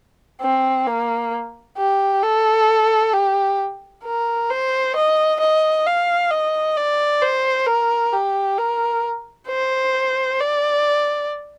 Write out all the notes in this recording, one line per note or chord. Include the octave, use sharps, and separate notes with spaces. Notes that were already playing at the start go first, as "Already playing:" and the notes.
C4
A#3
G4
A4
G4
A#4
C5
D#5
D#5
F5
D#5
D5
C5
A#4
G4
A#4
C5
D5